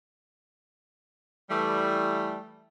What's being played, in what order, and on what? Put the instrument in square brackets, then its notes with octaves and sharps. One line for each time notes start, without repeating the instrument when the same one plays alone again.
[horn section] E3 G3 A3